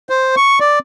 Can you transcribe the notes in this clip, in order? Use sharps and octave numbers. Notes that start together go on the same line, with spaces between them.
C5
C#6
D5